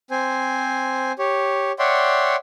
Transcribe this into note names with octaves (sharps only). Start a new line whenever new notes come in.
C4 C5 G#5
G4 C#5
C#5 D5 E5 F#5 G5 C6